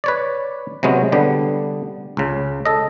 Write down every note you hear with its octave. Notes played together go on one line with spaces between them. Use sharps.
B4 C#5 D5
C3 F#3 G#3 B3 C#4
D3 G3 B3 G4
C#2 C#3
A4 D#5